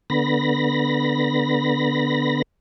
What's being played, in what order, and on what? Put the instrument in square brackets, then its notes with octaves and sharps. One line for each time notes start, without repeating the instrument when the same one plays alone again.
[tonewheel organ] D3 B3 B5 A#6